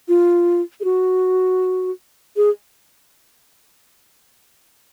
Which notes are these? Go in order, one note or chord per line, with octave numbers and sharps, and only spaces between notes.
F4
G#4
F#4
G#4